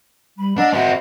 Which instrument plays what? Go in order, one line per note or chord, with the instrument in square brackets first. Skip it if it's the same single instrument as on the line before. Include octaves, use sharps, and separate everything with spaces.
[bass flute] G3 [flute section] B5
[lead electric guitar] D4 [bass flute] D#5 [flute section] F#5 A#5 E6
[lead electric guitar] C4 F#4 [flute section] C5 E5 B5